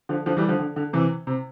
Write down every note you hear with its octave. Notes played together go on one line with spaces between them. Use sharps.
D3 F3
D3 F3
E3 G3
D3 F3
D3
D3
C3 E3
C3